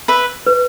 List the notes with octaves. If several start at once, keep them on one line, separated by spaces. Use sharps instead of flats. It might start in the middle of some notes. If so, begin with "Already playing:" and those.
B4 E5
B4